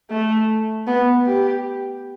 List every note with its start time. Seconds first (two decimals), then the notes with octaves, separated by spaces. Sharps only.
0.10 A3
0.87 B3
1.27 G4